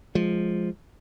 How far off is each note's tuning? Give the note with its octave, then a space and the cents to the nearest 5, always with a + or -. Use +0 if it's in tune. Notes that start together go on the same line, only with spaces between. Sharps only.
F3 +0 G#3 +0